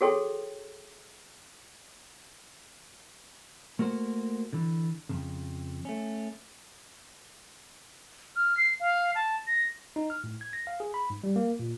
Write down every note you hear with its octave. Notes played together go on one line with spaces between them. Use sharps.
F#4 G#4 A4 C#5 G5 C6
A3 A#3 F#4 C5
D3 E3
F2 A#2 C#3
A3 C#4
F6
C7
F5
A5
A#6
D#4
F6
A2
G#6
A#6
F5
G#4
B5
G#2
G3
A#3
A#2